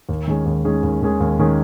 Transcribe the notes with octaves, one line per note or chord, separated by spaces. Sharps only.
D#2
D#3 G#3 C#4 G#4
D#2
D#3 G#3 C#4 G#4
D#2
D#3 G#3 C#4 G#4
D#2
D#3 G#3 C#4 G#4